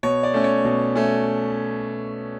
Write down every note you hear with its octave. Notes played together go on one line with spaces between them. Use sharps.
B2 C#5
D5
A3 C#4
C#5
B2
A3 C#4